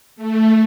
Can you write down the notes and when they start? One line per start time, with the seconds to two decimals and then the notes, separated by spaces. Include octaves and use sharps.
0.16 A3